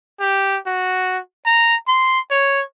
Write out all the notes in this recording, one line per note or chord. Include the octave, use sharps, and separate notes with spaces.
G4
F#4
A#5
C6
C#5